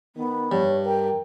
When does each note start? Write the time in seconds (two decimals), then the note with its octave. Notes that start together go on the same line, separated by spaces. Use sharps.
0.16 D#3 B3
0.52 G2 C#5
0.86 A#4 G5